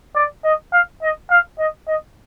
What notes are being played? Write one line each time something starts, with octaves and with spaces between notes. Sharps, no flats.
D5
D#5
F5
D#5
F5
D#5
D#5